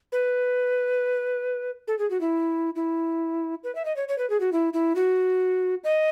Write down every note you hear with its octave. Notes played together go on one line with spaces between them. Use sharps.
B4
A4
G#4
F#4
E4
E4
B4
E5
D#5
C#5
C#5
B4
G#4
F#4
E4
E4
F#4
D#5